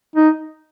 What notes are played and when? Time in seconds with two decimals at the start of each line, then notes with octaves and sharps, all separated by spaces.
0.15 D#4